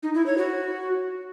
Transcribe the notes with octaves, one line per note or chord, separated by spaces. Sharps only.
D#4
E4
C#5
F#4